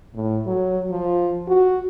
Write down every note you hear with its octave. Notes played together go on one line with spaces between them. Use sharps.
A2
F#3
F3
F#4